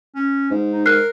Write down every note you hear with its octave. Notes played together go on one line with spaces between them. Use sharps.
C#4
G#2
D#4
A#4 F6 F#6 C7